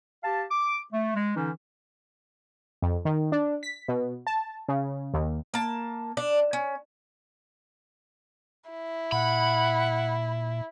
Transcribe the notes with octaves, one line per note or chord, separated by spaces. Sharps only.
G4 F5 A5
D6
A3
G#3
D3 E3 C#4 D#4
F2
D#3
D4
B6
B2
A5
C#3
D#2
A#3 A5
D4
C#4
E4
A#2 F#5 B5